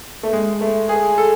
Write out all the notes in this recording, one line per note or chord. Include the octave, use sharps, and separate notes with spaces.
A3
G#3
A3
G#4
A4